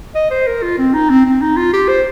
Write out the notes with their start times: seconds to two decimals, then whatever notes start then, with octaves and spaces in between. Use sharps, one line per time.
0.15 D#5
0.31 C5
0.47 A#4
0.63 F4
0.78 C4
0.94 D#4
1.10 C4
1.26 C4
1.42 D#4
1.57 F4
1.73 G4
1.89 C5